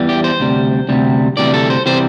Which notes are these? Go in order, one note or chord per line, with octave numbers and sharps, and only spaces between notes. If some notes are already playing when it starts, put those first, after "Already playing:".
Already playing: E2 E3 G3
G4
C5
D2 C3 G3
D2 C3 G3
D2 C3 E3 G3 D5
A4
C5
C3 E3 G3 C5